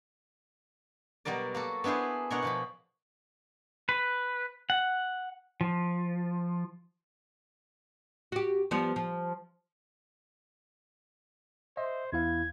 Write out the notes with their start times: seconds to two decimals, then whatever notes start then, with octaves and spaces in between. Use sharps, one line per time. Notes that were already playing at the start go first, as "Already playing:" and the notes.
1.25 B2 F#3 G3 A#4 D5
1.54 A#3 F#4 A4
1.84 B3 D4 E4 G#4 C5
2.30 B2 D4 A#4 C#5 F#5
2.43 B2 F3 B5
3.89 B4
4.70 F#5
5.61 F3
8.32 F#4 G4
8.71 F3 G3 B3
8.96 F3
11.77 C5 D#5 E5
12.13 E2 E4 F5 G#6